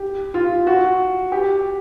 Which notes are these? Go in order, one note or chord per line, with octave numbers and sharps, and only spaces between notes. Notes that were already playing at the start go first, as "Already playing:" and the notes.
Already playing: G4
F4
F#4
G4